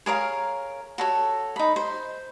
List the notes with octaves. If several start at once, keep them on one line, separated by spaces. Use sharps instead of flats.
G#4 A#4 C#5 F5
F#4 A4 C#5
D#4 B5
C5